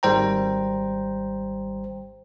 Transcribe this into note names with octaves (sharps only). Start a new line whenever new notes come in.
G#1 G3 C5 G5 A#5